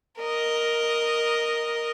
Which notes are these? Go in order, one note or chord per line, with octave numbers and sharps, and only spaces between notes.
A#4 D#5